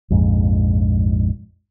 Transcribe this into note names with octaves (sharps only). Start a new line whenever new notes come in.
A#1 F2 G#2